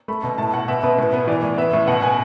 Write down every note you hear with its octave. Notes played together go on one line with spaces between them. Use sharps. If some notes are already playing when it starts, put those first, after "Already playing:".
A3 B5
B2
A2 A5
A2 F#5
B2 E5
B2 B4
A2 B4
B3
E3 D5
A2
B3 E5
A2
B2 F#5
B3 G#5